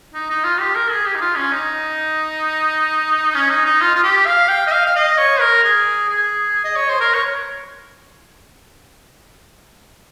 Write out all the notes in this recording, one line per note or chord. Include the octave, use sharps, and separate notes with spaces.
D#4
D#4
F4
G4
A#4
G#4
G4
D#4
F4
C#4
D#4
C#4
D#4
D#4
F4
F4
G4
F5
G5
D#5
F5
F5
D#5
C#5
A#4
G#4
G#4
D#5
C#5
C5
A#4
C#5